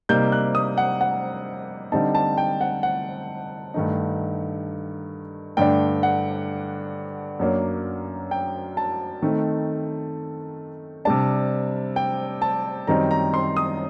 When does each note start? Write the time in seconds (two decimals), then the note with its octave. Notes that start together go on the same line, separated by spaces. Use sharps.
0.09 C3 G3 A#3 D#4 G6
0.32 F#6
0.55 D#6
0.78 F#5
1.01 F#5
1.92 D3 G3 C4 D#4 A5
2.15 A5
2.38 G5
2.61 F#5
2.83 F#5
3.74 G2 D#3 A3 D#4
5.57 G2 D3 A3 D4 G5
6.03 F#5
7.40 F#2 F#3 A#3 D4
8.31 G5
8.77 A5
9.22 D#3 A3 C4 D#4
11.05 C3 G3 D4 A5
11.96 G5
12.42 A5
12.87 F#2 D#3 G3 C4 D#4 A#5
13.11 A#5
13.34 C6
13.57 D#6